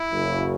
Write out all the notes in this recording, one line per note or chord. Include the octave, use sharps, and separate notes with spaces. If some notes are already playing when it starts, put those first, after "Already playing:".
Already playing: E4
F#1 F#2 C#3